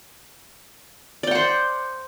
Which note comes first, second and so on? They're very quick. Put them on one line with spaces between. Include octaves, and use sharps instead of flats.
D5 G5 F#5 C5